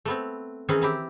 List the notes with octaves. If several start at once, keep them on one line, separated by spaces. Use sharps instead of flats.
A3 B3 C4
D#3 E3 C4 C#4 G#4
C4 E4 G4